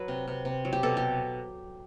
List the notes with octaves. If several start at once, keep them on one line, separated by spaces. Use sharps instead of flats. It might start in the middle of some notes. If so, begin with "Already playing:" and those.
Already playing: F#3 B4
C3
C3
C3
F#3
G4
B2 A4
G4